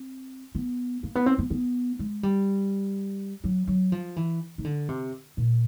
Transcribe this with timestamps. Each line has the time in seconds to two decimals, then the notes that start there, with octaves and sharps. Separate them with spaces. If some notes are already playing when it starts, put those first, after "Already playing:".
Already playing: C4
0.55 B3
1.03 A#3
1.15 B3
1.26 C4
1.39 B3
1.50 B3
1.99 G#3
2.23 G3
3.44 F#3
3.67 F#3
3.92 F3
4.16 E3
4.58 D#3
4.64 D3
4.89 C3
5.37 A#2